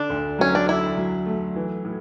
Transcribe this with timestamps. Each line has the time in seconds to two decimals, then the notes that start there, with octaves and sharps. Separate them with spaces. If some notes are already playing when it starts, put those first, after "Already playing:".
Already playing: D3 D4
0.10 D2
0.39 F#3 C#4
0.55 D4
0.68 D3 E4
0.97 F#3
1.26 A3
1.56 E3
1.85 A2